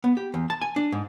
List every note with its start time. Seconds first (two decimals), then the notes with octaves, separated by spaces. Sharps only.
0.04 B3
0.17 G4
0.34 E2
0.50 A5
0.62 G#5
0.76 D4
0.92 G#2